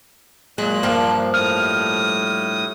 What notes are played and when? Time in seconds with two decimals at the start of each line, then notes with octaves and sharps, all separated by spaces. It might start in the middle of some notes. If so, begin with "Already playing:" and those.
0.58 F#2 A#2 F#3 G#3 F#6
0.83 G2 F3 A#3
1.34 A2 D#6 F6